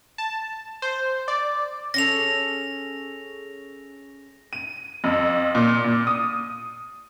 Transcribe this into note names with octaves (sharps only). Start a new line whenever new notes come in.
A5
C5
D5
C#4 G#4 A4 A#6 F7
D#7
F2
A#2
A#2
D#6